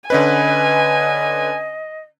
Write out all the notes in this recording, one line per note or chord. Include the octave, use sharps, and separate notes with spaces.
D3 C#4 B4 D#5 G#5